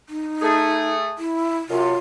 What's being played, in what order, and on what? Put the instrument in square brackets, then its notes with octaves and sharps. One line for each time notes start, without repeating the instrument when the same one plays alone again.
[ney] D#4
[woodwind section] A3 G#4
[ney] E4
[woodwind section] F#2 C3 [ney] F4